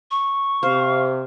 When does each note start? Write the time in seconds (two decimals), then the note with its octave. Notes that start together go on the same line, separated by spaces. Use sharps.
0.11 C#6
0.63 C3 C5 F5